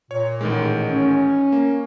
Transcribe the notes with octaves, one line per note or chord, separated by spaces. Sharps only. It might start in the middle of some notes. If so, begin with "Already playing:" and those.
A#2 C#5
A1 D#3 G#3
C#4
A#3